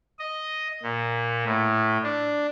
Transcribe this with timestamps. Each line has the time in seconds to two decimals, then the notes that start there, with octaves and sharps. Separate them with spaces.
0.19 D#5
0.83 A#2
1.46 A2
2.04 D4